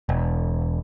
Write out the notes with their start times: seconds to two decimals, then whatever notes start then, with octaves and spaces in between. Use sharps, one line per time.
0.09 E1